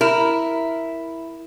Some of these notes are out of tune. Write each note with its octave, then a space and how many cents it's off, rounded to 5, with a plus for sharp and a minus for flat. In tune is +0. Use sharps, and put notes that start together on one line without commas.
E4 +0 A#4 +0